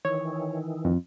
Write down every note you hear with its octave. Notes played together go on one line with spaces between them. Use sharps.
D#3 E3 C#5
F2